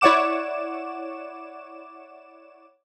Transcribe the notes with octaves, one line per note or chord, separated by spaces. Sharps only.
E4 C#5 D5 F#5 D6 E7